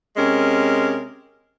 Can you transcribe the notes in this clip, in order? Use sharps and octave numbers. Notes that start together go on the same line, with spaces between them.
C3 G#3 C#4 A#4